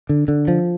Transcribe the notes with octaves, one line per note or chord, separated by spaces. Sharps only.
D3
D3
F3